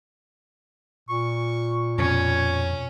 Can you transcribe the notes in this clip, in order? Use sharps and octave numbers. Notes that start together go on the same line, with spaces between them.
A#2 C#6
F2 B2 C#4 C#5